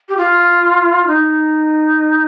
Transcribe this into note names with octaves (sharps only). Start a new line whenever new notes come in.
G4
F4
D#4